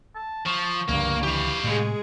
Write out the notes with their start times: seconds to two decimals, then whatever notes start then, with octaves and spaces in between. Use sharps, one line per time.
0.15 A5
0.46 F3 C#6
0.88 C#2 G2 D3 F3 A#3
1.23 E3 G4 F5
1.64 A2 C3 G#3 G#4